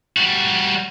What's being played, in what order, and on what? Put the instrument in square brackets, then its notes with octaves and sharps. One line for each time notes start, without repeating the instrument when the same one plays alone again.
[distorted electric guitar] G3 F#4